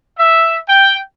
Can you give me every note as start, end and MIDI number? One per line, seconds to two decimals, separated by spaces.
0.18 0.58 76
0.68 0.98 79